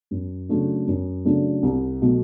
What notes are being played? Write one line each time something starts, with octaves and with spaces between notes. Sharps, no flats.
F#2
C#3 F#3 A3 D4
F#2
C#3 F#3 A3 D4
C2
B2 F#3 A3